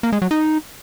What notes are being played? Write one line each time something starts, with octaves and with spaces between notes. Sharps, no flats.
A#3
G#3
F#3
D#4